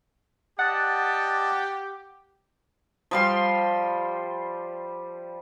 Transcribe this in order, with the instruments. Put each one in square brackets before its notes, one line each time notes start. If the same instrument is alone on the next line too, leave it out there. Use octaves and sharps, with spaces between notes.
[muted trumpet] G4 [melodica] D5 D#5 A5 [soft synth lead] F#5
[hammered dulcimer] F3 G3 C6